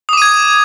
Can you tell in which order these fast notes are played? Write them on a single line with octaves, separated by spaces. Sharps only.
D#6 D6 D#7 G#6